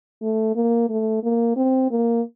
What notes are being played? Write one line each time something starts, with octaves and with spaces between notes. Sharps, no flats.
A3
A#3
A3
A#3
C4
A#3